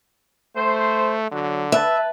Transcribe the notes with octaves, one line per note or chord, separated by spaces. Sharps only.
A3 C5
D3 F#3
B4 E5 A5